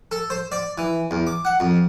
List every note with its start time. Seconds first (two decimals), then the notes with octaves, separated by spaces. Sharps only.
0.11 A4
0.30 C5
0.52 D5
0.78 E3
1.11 E2
1.27 D6
1.45 F#5
1.60 F2